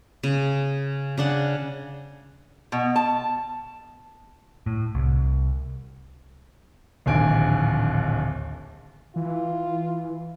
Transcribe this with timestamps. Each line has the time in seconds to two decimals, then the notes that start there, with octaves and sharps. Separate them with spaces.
0.23 C#3
1.18 C#3 D4 F#5
2.72 B2
2.96 A5
4.66 A2
4.95 C2
7.06 D1 A#1 D#2 G#5 D7
9.16 E3 F4